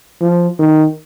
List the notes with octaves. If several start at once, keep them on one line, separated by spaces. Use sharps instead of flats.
F3
D#3